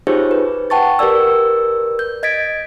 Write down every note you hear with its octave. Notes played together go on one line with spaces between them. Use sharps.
D#4 F4 G4 G#4 C5 C#5
B4
F#5 G5 A5 C#6 A6
G4 A#4 B4 D5 E6
G6
D#5 G#6 A6 B6 D7